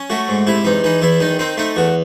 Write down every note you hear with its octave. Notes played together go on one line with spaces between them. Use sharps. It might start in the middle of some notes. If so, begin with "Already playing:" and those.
Already playing: C#4
A3 F#4
G#2
C3 E4
E2 D#4
E3 D#4
E2 E4
D#3 D#4
C4 D#4
A3 D#4
E2 F#4